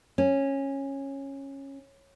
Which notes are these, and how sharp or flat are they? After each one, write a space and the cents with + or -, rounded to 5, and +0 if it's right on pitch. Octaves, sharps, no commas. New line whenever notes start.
C#4 -15